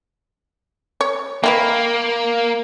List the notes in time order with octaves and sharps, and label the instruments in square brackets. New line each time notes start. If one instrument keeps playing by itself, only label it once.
[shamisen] C#5
[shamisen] D#3 E4 B4 [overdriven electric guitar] A#3